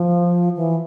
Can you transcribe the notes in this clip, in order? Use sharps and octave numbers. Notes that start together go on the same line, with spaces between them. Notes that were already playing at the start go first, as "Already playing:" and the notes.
Already playing: F3
E3